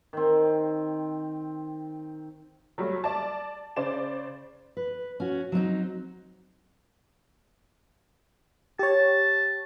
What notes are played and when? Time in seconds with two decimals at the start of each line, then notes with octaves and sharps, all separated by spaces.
0.13 D#3 C4
2.78 F#3 G3 A3
3.04 D5 A5
3.76 C#3 C5 D5 E7
4.77 B4
5.20 C#4 F#4
5.52 F#3 C4 D4 D#4
8.79 G4 C#5 A5